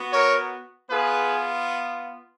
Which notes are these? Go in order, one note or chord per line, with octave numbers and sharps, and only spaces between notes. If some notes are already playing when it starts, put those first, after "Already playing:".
Already playing: B3 F#4
A#4 C#5
B3 F4 G#4 B4